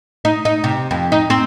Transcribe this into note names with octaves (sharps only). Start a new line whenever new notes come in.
D#4
D#4
C3
F2
D#4
C4